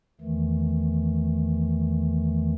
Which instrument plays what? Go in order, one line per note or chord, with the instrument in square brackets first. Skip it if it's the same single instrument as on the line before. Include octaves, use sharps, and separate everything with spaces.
[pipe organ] E2 D#3 E3 A3